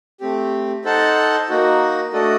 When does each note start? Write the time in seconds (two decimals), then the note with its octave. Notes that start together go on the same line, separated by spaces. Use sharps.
0.21 A3 C4 G4
0.85 D#4 A4 C5 F#5 A5
1.49 A#3 D#4 F#4
2.13 A3 D4 F#4 A4 D#5